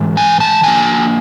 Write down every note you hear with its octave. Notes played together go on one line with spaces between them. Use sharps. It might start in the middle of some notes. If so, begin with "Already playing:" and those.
Already playing: G#2 E3
G#5
A5
G2 D3 F3 A#3 G#5